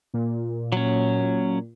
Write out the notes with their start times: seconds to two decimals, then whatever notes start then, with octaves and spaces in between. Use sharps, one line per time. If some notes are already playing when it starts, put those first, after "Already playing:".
0.14 A#2
0.72 F#3 C#4